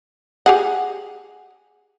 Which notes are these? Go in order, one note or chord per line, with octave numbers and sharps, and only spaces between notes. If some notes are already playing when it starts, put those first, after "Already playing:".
G4 G#4 F#5